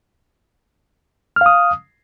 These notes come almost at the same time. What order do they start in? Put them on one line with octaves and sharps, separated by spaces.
F6 F5 D#6